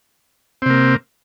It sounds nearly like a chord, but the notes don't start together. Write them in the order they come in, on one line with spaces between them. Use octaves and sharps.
C4 C3 A#3